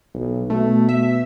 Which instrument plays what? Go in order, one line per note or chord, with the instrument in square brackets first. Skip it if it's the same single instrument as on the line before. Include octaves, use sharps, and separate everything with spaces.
[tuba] B1
[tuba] B2 [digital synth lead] A3
[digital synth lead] E5